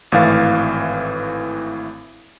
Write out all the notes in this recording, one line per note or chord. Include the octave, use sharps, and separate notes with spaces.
G#1 A2 E3 F5 A6